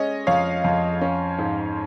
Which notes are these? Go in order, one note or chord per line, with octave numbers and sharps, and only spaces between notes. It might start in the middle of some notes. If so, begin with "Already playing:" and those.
Already playing: G#3 C#4 C#5 D#5
F2 C#5 F5
F2
C#4
G#2